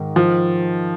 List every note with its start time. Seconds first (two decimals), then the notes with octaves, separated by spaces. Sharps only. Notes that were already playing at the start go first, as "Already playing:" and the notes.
Already playing: G#2 D#3
0.16 F3